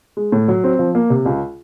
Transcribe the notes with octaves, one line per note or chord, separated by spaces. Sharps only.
G#3
A2
F#3
C4
F3
A#3
C3
C#2